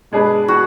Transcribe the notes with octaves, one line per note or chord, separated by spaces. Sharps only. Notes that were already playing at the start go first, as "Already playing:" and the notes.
B2 G#3 D4 G#4 B4
F#4